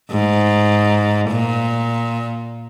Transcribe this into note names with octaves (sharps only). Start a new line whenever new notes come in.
G#2
A#2